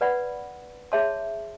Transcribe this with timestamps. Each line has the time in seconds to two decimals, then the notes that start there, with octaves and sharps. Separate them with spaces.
0.01 B4 D5 F#5 B5
0.92 G#4 C#5 E5 A5 C6